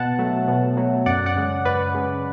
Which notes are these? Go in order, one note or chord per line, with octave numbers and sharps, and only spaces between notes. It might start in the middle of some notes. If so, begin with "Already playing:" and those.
Already playing: B2 F#5 A5
F#3 A3
B2
F#3 A3
F#2 D5 F#5
D5 F#5
C#3 G#3
F#2 B4 D5
C#3 G#3